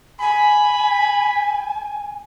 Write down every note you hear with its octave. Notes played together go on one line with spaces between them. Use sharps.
G#5 B5